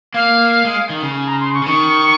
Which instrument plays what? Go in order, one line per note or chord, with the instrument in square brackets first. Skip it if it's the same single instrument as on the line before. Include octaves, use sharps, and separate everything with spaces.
[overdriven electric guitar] A#3 [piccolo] F5
[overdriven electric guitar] G#3
D#3
C#3
[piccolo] G#5
A#5
C6
C#6
[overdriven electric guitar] C#3
[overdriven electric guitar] D#3 [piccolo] C#6